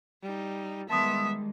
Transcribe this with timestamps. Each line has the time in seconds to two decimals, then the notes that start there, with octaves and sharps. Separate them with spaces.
0.23 G3 D#4
0.89 D#3 G3 G#3 B3 E5 A5 C6 D#6